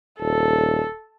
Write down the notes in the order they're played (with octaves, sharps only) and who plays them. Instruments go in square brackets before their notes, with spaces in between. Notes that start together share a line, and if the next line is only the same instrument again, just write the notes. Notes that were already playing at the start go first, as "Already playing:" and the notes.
[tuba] D#1 [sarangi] A4